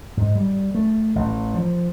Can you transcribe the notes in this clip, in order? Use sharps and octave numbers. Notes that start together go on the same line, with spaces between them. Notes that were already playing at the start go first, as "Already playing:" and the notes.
G#2
G3
A3
A1
F3